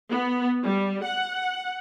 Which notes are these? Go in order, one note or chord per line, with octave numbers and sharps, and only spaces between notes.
B3
G3
F#5